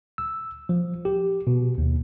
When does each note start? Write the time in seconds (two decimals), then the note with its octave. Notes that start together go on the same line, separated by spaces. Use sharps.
0.18 E6
0.69 F3
1.05 G4
1.47 B2
1.78 D#2